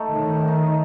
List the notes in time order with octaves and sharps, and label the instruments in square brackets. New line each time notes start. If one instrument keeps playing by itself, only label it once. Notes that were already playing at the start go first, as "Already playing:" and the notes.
Already playing: [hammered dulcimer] A3 D#4 A4
[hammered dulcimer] A2 [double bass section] D#3
[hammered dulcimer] A3 D#4